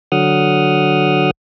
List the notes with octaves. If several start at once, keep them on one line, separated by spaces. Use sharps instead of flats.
D3 F#3 F#5 D#6 F6